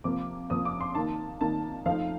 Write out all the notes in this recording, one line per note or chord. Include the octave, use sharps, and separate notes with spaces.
C3 F3 A#3 D6
C3 F3 A#3 D#6
D6
C6
D#3 A#3 D#4 A5
D#3 A#3 D#4 A5
F3 A3 D#4 F5